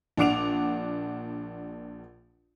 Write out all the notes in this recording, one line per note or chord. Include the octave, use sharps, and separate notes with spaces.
A#1 D4 F#5 D6 D7 F7